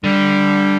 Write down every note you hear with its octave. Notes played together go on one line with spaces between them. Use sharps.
D3 G3